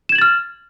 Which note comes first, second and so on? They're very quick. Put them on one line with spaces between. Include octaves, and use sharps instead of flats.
E7 G#6 F#7 A6 F6